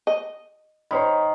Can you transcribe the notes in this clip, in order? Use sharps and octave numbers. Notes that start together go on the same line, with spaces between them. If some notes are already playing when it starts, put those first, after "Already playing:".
D#5
D#3 C5 C#5 B5